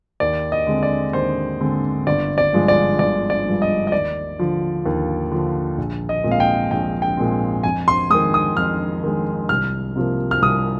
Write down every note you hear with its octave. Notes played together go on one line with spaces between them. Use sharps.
D#2 D5
D#5
D3 G#3 C4
D5
D#2 C5
D3 G#3 C4
G1 D5
D5
G2 F3 G#3
D5
G1 D5
D5
G2 F3 G#3
D#5
D#5
D#2 D5
D3 F3
D#2
D3 F3
A#1
D#5
A#2 G#3 C4
F5
G5
A#1 G5
G5
A#2 G#3 C4
F2 G#5
C6
D#3 G#3 D#6
D#6
F2 F6
D#3 G#3
C2 F6
C3 F3 A#3
F6
C2 D#6